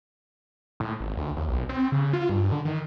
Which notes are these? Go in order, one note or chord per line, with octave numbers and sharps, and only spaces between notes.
A2
G#1
D2
D#2
B1
C4
C#3
F4
G2
D3
D#3